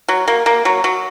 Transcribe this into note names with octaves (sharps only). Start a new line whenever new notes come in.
F#3
A#3
A#3
F#3
F#3